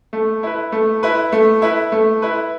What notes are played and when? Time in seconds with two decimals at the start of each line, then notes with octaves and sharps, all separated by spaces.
0.13 A3
0.43 E4 B4
0.72 A3
1.03 E4 B4
1.32 A3
1.62 E4 B4
1.92 A3
2.22 E4 B4